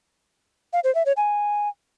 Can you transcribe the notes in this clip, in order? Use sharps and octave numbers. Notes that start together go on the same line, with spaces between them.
F5
C5
E5
C#5
G#5